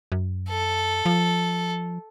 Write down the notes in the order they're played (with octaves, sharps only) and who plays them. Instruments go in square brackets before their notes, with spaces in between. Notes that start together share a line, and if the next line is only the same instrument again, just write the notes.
[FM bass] F#2
[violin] A4
[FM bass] F3